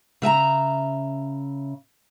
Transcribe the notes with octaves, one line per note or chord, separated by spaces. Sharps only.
C#3 E5 G#5 A#5